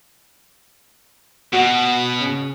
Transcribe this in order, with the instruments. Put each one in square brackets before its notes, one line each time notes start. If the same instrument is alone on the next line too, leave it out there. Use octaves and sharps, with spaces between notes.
[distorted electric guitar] B2 [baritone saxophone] F#4
[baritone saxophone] C#3